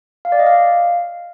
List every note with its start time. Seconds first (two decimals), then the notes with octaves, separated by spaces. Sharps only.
0.25 F5
0.32 D5
0.39 D#5
0.47 F5